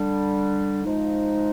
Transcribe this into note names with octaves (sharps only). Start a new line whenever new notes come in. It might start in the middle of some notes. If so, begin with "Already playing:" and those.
Already playing: D3 G3 D4
F3 G#3 D#4